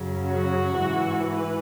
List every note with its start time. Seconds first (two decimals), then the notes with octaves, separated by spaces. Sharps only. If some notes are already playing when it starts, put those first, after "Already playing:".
Already playing: F#2 C#3 F#3
0.32 F#4
0.77 G#2 E3
1.25 B4